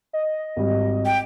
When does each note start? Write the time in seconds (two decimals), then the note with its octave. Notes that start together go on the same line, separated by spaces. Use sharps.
0.13 D#5
0.56 G#1 G3
1.06 G5